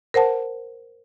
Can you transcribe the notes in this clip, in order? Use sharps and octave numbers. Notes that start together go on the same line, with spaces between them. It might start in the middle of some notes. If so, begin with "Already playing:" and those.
A#4 C5 F#5 A5